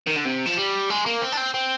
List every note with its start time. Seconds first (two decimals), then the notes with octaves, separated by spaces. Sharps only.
0.07 D#3
0.17 D3
0.25 C3
0.46 F3
0.58 G3
0.90 G#3
1.06 A#3
1.22 C4
1.32 D4
1.37 C4
1.54 C4